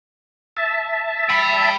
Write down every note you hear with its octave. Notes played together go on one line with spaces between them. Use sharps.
E5 A5
G5 B5